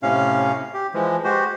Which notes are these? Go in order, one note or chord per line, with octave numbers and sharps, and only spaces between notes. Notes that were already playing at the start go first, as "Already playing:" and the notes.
A2 C3 C#4 F5
G4
E3 F3 G#3
G#3 F#4 G4 C5